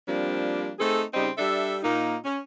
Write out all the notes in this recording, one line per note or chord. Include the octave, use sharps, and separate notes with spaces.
F3 G3 A#3 C4 D4
A3 C4 D#4 G#4 A4
C#3 G3 C4 D#4
G3 D4 A4 E5
A#2 A#3 D#4
C#4